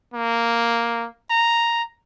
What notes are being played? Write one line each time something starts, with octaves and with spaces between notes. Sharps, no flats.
A#3
A#5